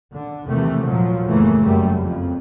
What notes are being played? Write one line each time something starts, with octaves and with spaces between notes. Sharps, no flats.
D3
D#2 C3 E3 A3
A#2 F3 F#3
F#1 C#3 E3 A3 A#3
F#2 G3 A3
F2